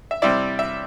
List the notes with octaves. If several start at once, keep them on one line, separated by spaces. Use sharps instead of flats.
E5
C3 G3 C4 E4 D5
E5